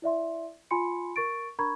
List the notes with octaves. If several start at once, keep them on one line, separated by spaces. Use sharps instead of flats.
E4 D5 E5 C6
F4 G#5 B5 C6 C#7
A#4 C#6 A6 D7
D4 A#4 A#5 B5 C#6 G#6